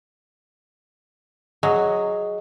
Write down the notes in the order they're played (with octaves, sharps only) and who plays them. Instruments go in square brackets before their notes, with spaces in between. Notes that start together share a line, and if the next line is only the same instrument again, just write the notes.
[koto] F#3 [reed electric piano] G#4 D#5